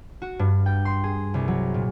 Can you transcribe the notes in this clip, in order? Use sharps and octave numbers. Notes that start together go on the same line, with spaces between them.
F#4
G2
G5
C6
G#4
C2
F#3
A#2